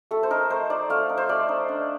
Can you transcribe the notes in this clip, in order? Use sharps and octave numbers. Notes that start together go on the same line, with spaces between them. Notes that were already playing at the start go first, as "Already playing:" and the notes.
A3 A4
C5
D#4 A#4
A3 C5
D#4 D5
A3 F5
D#4
C5
A3 D5
D#4
D4